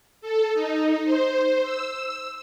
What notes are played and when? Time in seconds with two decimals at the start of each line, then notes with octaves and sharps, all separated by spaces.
0.21 A4
0.54 D#4
1.04 C5
1.63 E6